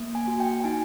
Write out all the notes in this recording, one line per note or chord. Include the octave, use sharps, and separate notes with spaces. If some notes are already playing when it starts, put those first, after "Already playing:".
Already playing: A#3
G#5
F#4
G5
G5
D#4 G#5